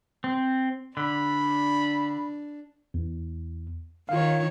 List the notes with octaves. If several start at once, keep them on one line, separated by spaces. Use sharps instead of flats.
C4
D3 D4 B5
E2
D#3 F4 C#5 F5